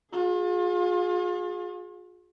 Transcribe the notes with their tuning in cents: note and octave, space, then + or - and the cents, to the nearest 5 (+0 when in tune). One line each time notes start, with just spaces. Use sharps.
F4 +40 G#4 +0